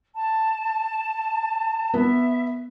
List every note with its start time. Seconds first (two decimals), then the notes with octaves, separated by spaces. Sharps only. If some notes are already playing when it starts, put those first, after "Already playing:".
0.15 A5
1.94 B3 E5